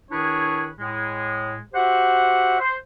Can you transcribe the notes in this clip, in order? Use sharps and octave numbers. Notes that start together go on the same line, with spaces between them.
D#3 D4 E4 G#4 B4 C#5
A2 G#3
F#4 G4 C5 E5 F#5
C5